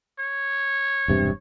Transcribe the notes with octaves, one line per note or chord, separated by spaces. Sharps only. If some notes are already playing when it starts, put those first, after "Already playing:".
C#5
E1 G2 C3